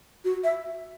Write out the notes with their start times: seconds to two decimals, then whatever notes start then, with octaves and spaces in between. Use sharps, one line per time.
0.25 F#4
0.44 E5